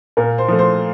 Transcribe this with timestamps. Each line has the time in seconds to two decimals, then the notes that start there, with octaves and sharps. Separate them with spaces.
0.17 A#2 A#4
0.38 C5
0.48 F3 A3
0.59 C5